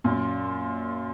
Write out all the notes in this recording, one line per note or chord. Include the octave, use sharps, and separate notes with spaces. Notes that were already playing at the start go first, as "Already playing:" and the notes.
F#2 A#2